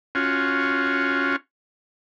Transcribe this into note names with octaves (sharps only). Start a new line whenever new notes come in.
C#4 F4 F#4